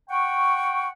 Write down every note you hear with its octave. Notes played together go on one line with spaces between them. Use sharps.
F#5 G5 C#6